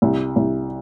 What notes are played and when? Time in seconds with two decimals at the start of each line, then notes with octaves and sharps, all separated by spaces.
0.02 C2
0.36 C2